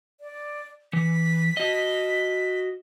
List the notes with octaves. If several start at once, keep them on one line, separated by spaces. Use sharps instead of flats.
D5
E3 B6
F#4 D#5